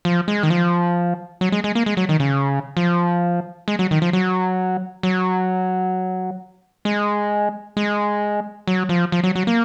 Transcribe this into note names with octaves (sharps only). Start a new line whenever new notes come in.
F3
G#3
D#3
F3
F#3
G#3
G#3
A#3
G#3
F#3
D#3
C#3
F3
G#3
F#3
D#3
F3
F#3
F#3
G#3
G#3
F#3
F3
F3
F#3
F#3
A#3